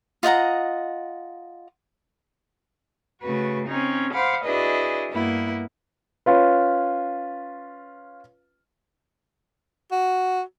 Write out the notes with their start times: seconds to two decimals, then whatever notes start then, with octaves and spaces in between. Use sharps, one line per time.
0.23 F4 D#5 F#5 A#5
3.21 C#3 A3 F#4 B4
3.68 C4 C#4 D#4
4.13 C5 F5 F#5 B5 D6
4.44 D4 E4 F#4 G#4 B4 D#5
5.11 G2 A#3 B3 E4
6.26 C#4 F4 B4
9.92 F#4